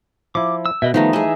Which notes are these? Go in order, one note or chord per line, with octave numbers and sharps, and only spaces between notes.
F3 E4 D6
E6
B2 B4 D#5 E5
D#3 F3 G3 A3 B3 D#4 A#5
E3 G#4 D#5 E5 G#5